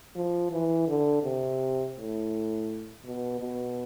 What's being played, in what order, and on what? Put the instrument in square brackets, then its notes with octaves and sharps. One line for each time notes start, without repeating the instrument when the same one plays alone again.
[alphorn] F3
E3
D3
C3
A2
B2
B2